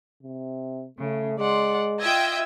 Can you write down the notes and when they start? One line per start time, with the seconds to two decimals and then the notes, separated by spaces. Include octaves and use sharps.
0.23 C3
0.99 C#3 A3
1.38 G#3 D5 F#5 C6
2.00 F4 D#5 E5 G5 E6 G#6